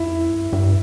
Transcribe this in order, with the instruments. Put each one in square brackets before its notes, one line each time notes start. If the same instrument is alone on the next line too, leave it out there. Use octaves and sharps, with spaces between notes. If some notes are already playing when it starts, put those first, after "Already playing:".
Already playing: [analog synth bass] F2 [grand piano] E4
[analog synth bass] G2
G2